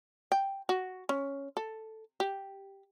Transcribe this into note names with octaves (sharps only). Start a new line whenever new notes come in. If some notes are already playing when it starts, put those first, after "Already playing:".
G5
F#4
C#4
A4
G4